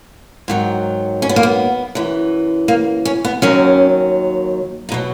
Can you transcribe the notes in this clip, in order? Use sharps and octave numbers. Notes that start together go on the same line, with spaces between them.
G#2 D#3 F#3
C#4
B3
A#3
B3
F#2 E3
A#3
C#4
B3
D#2 D#3 F#3 C#4
D#4
B2 F#3